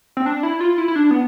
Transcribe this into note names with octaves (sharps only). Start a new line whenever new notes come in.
C4
D4
E4
F4
E4
E4
D4
B3